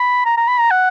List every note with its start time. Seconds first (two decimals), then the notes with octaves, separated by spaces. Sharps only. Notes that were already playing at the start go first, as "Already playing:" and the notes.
Already playing: B5
0.25 A#5
0.37 A#5
0.48 B5
0.59 A#5
0.71 F#5